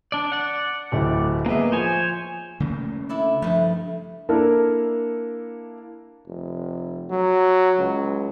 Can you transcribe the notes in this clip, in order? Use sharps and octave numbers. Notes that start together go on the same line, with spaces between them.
D4 D5
D5 F#5
D1 A3 G4
A#3 B3 G#4 D#5 E5
F3 C5 C#5 G#5
C#3 A3 A#3
D4 E4 A4
G2 F3 A3
A#3 D4 E4 A4 A#4
F1
F#3
C#2